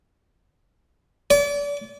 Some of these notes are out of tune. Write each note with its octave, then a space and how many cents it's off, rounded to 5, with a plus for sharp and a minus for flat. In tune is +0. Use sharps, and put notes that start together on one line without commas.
D5 -35